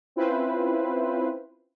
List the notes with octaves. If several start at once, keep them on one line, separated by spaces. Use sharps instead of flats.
C4 C#4 E4 F4 B4 C5